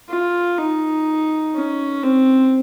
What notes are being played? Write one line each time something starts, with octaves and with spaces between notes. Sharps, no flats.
F4
D#4
C#4
C4